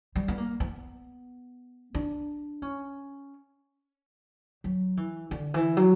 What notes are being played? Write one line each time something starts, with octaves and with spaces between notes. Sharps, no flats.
G3
B3
A#3
B3
D4
C#4
F#3
E3
D3
E3
F#3